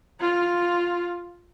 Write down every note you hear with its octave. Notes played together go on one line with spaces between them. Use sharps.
F4